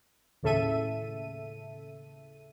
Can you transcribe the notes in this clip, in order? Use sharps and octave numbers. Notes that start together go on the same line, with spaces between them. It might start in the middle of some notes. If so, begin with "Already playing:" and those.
D#2 A2 C#3 A4 E5 D#7